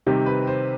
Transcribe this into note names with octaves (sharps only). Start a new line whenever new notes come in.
C3 D#3 G3 C4 G4
B4
C5